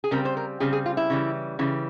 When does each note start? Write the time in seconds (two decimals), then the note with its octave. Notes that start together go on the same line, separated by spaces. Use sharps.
0.04 G#4
0.11 C#3 G3 C4 A#4
0.25 C5
0.37 A#4
0.60 C#3 G3 C4 G#4
0.73 G#4
0.86 F4
0.97 E4
1.10 C#3 E3 G3
1.59 C#3 E3 G3